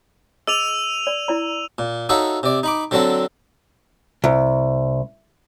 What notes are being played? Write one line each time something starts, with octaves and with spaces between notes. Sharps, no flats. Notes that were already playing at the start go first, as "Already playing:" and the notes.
G#4 D#5 E6 D#7 F7
D5
E4 D5 A#5
A#2
D#4 F#4 A4 C#5 E5 F5
C3 D5
D#4 B5 D6
D3 F#3 C4 F#4 A4
C2